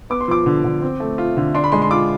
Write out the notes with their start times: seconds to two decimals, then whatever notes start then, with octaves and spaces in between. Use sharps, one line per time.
0.10 B3 D6
0.21 C6
0.28 F3 D6
0.46 D3
0.64 D3
0.82 C4
1.00 A3
1.18 F4
1.37 D3
1.55 D4 C6
1.64 B5
1.72 G#3 C6
1.82 C6
1.91 F4 D6